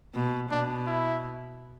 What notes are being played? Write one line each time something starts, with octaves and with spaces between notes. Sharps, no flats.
B2
B2 D4
E4